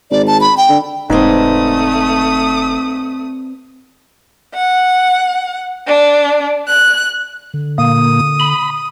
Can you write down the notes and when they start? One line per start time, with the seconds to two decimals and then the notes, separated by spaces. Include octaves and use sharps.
0.11 G#1 D5
0.27 A5
0.41 B5
0.57 G5
0.69 D3
1.10 F1 G#2 A3 C4 B4 D5 D#6
4.55 F#5
5.87 D4
6.67 F#6
7.54 D3
7.78 A#2 A#3 D#6
8.40 B5